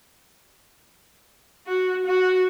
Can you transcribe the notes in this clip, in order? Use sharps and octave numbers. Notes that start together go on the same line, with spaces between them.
F#4
F#4